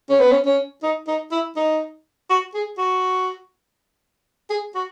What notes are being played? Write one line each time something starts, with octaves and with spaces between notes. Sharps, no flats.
C#4
B3
C#4
C#4
D#4
D#4
E4
D#4
F#4
G#4
F#4
G#4
F#4